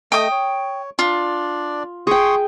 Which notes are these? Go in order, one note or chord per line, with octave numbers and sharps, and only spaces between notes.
A3 D#5 G5 D#6
C#5
D4 F4 D5
G#4 G5 C6 C#6 D#6